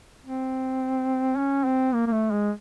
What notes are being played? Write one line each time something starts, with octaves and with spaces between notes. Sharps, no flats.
C4
C#4
C4
A#3
A#3
A3
G#3